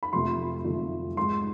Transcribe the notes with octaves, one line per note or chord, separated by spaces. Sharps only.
B5
F2 C3 F3 A3 C6
F2 C3 F3 A3
G#2 G#3 C6